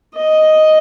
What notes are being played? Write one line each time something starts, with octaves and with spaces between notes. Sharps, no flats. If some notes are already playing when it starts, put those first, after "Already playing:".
D#5